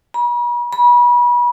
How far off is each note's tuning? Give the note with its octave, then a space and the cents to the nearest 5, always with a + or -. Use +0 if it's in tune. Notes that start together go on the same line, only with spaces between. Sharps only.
B5 -45
B5 -35